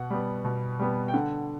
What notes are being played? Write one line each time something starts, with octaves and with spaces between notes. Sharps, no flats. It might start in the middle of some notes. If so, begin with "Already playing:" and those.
Already playing: B2 F#5
G3 B3
B2
G3 B3
G5
D3 F#5